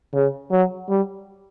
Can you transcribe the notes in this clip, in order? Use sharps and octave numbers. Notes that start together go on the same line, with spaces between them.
C#3
F#3
G3